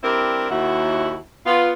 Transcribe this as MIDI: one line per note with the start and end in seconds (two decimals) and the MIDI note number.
0.03 0.47 55
0.03 0.47 60
0.03 0.47 62
0.03 0.47 64
0.03 0.47 67
0.03 0.47 70
0.50 1.17 39
0.50 1.17 64
0.50 1.17 66
1.46 1.72 59
1.46 1.72 65